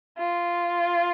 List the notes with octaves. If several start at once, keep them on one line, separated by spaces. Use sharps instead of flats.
F4